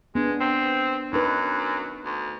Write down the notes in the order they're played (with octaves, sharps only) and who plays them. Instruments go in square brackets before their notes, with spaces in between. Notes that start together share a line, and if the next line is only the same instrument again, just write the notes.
[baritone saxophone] G#3 [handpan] B3 D4
[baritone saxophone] C4
[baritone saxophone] F#2 [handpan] D#4 B4
[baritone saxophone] D2